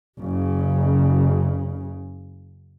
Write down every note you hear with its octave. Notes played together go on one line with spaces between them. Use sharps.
F#1 C#3